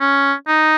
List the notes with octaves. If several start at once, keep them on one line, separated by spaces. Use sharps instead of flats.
C#4
D#4